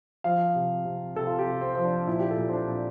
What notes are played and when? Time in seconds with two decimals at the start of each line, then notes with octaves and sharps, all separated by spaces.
0.24 F3 F5
0.55 C3
0.85 C3
1.16 C3 A4
1.27 F4
1.39 G4
1.46 C3
1.61 C4
1.75 F3 C4
1.84 D4
2.07 A#2 E4
2.20 G4
2.31 A4
2.37 A#2
2.48 C4
2.53 D4
2.68 A#2